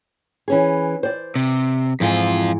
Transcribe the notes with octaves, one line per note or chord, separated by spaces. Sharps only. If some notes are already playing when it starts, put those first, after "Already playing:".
E3 C#4 G#4
C5 D5
C3
F2 G#2 E3 F4